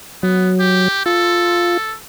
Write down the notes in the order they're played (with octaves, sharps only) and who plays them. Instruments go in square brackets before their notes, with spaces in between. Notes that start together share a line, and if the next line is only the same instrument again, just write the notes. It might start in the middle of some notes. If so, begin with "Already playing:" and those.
[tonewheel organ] F#3 [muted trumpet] B3
[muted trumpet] G4
[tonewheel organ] F4 [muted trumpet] A4